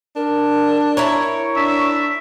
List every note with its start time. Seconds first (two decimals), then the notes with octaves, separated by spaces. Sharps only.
0.16 D4 A#4
0.97 E4 A#4 C#5 C#6
1.56 D4 E5